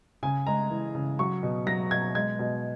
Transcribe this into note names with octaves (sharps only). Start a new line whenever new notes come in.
C#3 G#5
G#3 A#5
E3
C#3
F#3 C#6
B2
F#3 A#6
B2 G#6
G#3 G#6
B2